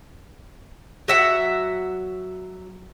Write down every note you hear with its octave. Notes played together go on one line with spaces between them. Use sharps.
F#3 E5 F#5